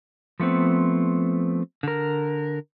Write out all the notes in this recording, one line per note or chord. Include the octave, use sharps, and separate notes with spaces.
F3 A3 B3 C4
D3 A#4